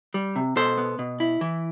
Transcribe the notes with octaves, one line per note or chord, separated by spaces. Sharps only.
G3
C3
B2 A4 C5
B3
B2
E4
E3